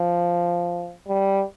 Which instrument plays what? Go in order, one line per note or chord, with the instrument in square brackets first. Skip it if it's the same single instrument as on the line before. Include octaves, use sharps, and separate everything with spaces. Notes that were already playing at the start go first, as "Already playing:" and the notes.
Already playing: [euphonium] F3
G3